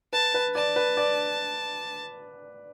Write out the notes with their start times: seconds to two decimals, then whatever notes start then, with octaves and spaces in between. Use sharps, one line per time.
0.13 B4 A5
0.34 B4
0.55 D5 A5
0.76 B4
0.97 D5